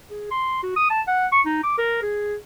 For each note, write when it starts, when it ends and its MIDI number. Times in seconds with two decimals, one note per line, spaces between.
0.11 0.31 68
0.31 0.60 84
0.63 0.73 66
0.76 0.90 87
0.90 1.01 81
1.07 1.27 78
1.32 1.41 85
1.46 1.60 63
1.63 1.76 86
1.78 2.00 70
2.02 2.36 68